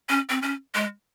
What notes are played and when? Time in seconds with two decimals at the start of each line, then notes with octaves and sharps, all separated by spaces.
0.09 C#4
0.30 C4
0.42 C#4
0.74 G#3